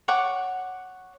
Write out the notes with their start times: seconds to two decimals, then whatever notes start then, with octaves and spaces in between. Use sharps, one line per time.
0.08 C#5 F#5 C#6 D6